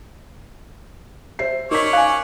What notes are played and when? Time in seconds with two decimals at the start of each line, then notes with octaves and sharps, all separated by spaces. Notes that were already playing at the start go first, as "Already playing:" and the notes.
1.39 C5 E5 C7
1.71 C#4 D#4 A#4 C#5 D5 B6
1.93 F5 G#5 F#6